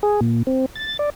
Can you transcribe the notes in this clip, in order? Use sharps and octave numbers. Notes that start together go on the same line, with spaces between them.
G#4
A#2
C4
A6
D5